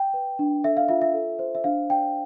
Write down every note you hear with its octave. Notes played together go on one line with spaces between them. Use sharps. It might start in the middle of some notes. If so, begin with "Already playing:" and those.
Already playing: G5
B4
D4
A4 E5
F5
F4 E5
E5
A4
C5
E5
D4 F5
D5 G5